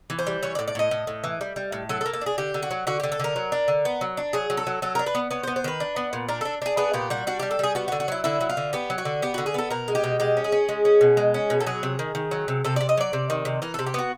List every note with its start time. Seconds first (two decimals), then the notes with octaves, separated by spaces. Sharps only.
0.10 E3
0.19 C5
0.27 G3
0.43 E3 C#5
0.55 D5
0.59 A2
0.68 D5
0.75 A2 D#5
0.91 A2
1.07 A2
1.24 E3
1.41 G3
1.56 G3
1.72 A2
1.89 F#3 A4
2.01 A4
2.06 A#3
2.13 A4
2.21 D4 G#4
2.38 D3 G4
2.54 D3
2.63 F#4
2.71 F#3
2.87 D3 F#4
3.00 D3 G4
3.12 A4
3.20 D3 A#4
3.36 F#3
3.52 D4
3.68 D3
3.85 B3
4.01 F#3
4.17 D4
4.33 F#3 G#4
4.50 F#3
4.57 A4
4.67 F#3
4.82 F#3 A4
4.95 D4 A#4
5.06 B4
5.15 B3
5.31 B3 C#5
5.43 C5
5.47 B3
5.56 C5
5.64 D#3 B4
5.80 D4
5.96 B3
6.13 A#2
6.29 D4 A#4
6.41 D4 A4
6.62 D4 G#4
6.77 B3 G#4
6.93 A#2 G4
7.10 G3 F#4
7.27 D4 F#4
7.40 G3 G4
7.51 A4
7.59 G3 G#4
7.75 B3 F#4
7.88 F#4
7.92 D3
8.00 F#4
8.08 F#3 E4
8.24 D3 E4
8.41 F#3
8.49 F4
8.57 D3
8.73 B3 G4
8.90 F#3
8.98 F#4
9.05 D3
9.22 B3 G4
9.34 D3 F#4
9.46 G#4
9.54 B3 A4
9.71 B2 A#4
9.88 G#3
9.95 G4
10.04 B2
10.20 G#3 G4
10.37 C#4
10.44 G#4
10.52 C#4
10.69 G#3
10.85 C#4
11.01 B2
11.17 G#3
11.34 C#4
11.50 B2
11.60 A4
11.67 F#3 G#4
11.83 C3
11.99 D#3
12.15 D#3
12.31 F#3
12.48 C3
12.65 C3 A4
12.76 C3 D5
12.89 D#5
12.97 F#3 D5
13.13 C3
13.30 D#3
13.45 C3
13.62 E3 A#4
13.74 C3 A4
13.86 G4
13.94 B3 F#4